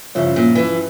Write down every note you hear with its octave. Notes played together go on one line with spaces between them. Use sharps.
G2 C#3 F3 C#4 E4
A#2
E3